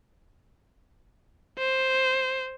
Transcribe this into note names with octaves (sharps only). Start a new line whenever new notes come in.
C5